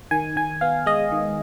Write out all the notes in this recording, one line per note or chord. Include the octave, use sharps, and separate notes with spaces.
D#3 G#5
D#3 G#5
B3 F5
G#3 D#5
D#3